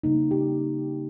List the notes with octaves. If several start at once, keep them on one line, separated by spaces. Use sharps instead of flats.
C#3 G3 A#3 D#4
G4